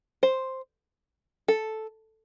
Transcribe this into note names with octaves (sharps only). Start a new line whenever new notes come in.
C5
A4